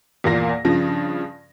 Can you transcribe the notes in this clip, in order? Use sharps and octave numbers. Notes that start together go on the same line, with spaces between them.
E2 A#2 A#3 F5 A#6
G2 C#3 F3 A#6